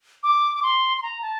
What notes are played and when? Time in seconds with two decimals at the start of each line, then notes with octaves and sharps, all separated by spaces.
0.23 D6
0.55 D6
0.63 C6
0.97 C6
1.02 A#5
1.22 A5